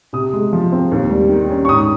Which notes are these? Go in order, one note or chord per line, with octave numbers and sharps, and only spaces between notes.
C3 D#6
G#3
F3
C4
D#2
G3
D#3
C#4
C#6
G#2 D#6